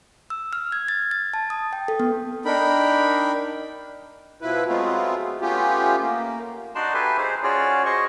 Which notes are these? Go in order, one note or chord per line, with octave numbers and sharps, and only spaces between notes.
E6
F6
G#6
A6
A6
A5
D#6
G5
A4
B3
D4 D#4 A#4 G5 B5
B2 F3 E4 B4
F#3 G#3 A3 B3 C4 F4
A3 B3 C#4 F4 G4
A#3
D4 D#4 F#4 D5 A5 C6
G4 A4 B4 E5 G#5 C6
D#4 G#4 C5 F5
C#4 F4 F#4 G#4 C#5 D5
C5 C#5 D#5 C6 C#6